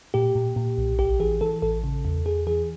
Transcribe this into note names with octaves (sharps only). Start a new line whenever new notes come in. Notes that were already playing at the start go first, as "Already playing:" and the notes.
A#2 G4
A#2
A#2
B1
A1 G4
E3 G#4
E3 A4
A1 A4
C#3
E2
E2 G#4
E3 G#4